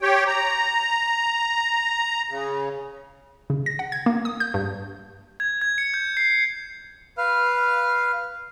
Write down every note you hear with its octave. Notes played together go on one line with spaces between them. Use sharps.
G4 C#5 G5
A#5
C#3
C#3
A#6
F#5
G#6
A#3
D#6
G6
G2
G#6
G#6
C#7
G6
C7
B4 F5 F6